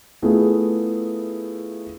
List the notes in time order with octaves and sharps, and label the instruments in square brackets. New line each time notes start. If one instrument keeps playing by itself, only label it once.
[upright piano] A3 B3 E4 F4 G#4